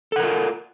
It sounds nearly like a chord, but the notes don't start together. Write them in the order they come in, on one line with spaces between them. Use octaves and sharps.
A4 F#5 A#4 F4